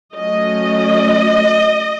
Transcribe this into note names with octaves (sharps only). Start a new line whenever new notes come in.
F#3 A3 C#4 D#5